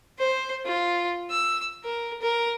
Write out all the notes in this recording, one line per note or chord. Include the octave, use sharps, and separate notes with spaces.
C5
F4
E6
A#4
A#4